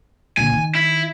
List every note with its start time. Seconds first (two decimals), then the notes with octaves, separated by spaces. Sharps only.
0.37 A#2 D3 G#5
0.52 D#3
0.75 E4